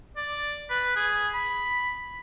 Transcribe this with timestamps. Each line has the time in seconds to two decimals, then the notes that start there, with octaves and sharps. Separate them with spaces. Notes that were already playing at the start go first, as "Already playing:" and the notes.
0.17 D5
0.70 B4
0.96 G#4
1.34 B5